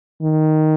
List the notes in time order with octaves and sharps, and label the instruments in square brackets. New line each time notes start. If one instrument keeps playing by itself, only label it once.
[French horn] D#3